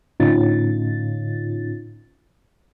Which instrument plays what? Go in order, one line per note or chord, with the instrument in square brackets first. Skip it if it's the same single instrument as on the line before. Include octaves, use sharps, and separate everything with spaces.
[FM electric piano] A2 D3 C#4 D#4 F4 A6